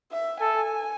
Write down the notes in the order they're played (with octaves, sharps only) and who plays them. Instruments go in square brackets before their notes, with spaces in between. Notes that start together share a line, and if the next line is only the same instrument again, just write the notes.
[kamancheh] E5
[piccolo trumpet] A4 [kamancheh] G#5